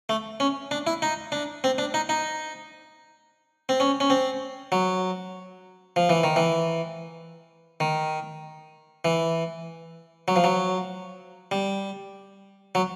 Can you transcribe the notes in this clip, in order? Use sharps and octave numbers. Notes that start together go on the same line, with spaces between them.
A3
C#4
D4
E4
D#4
D4
C4
D4
D#4
D#4
C4
C#4
C#4
C4
F#3
F3
E3
D#3
E3
D#3
E3
F#3
F3
F#3
G3
F#3